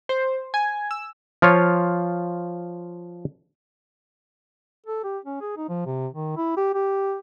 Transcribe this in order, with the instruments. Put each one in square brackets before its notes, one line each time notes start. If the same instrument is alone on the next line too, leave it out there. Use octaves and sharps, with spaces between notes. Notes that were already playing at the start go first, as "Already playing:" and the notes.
[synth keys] C5
G#5
E6
[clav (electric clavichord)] F3 F4 C#5
[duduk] A4
G4
C#4
G#4
D#4
F3
C3
D#3
E4
G4
G4